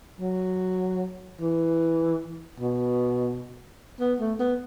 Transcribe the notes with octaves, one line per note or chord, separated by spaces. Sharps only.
F#3
E3
B2
B3
A3
B3